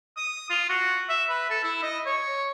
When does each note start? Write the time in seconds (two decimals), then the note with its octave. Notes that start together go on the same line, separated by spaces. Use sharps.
0.17 D#6
0.50 F4
0.69 F#4
1.09 E5
1.29 B4
1.50 A4
1.63 E4
1.83 D#5
2.06 C#5